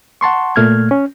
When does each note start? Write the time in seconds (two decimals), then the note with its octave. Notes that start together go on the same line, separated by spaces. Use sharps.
0.21 F#5 A5 C6 C#6
0.56 A#2 A3 F6 G#6
0.91 C#4